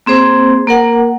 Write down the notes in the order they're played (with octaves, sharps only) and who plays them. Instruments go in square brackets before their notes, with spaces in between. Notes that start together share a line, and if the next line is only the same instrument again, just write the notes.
[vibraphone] A#3 C4 G#4 C5
A#3 A#4 F#5